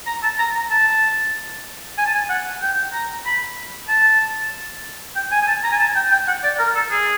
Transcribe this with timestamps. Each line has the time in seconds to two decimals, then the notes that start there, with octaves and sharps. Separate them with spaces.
0.07 A#5
0.23 A5
0.39 A#5
0.55 A#5
0.71 A5
1.98 G#5
2.06 A5
2.14 G#5
2.29 F#5
2.62 G5
2.93 A#5
3.26 B5
3.89 A5
5.16 G5
5.32 G#5
5.42 G#5
5.47 A5
5.64 A#5
5.72 G#5
5.79 A5
5.96 G5
6.11 G5
6.28 F#5
6.44 D5
6.59 A#4
6.75 A4
6.91 G#4